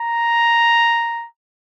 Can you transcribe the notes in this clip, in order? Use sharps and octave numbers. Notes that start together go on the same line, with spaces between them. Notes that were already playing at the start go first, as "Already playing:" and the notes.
Already playing: A#5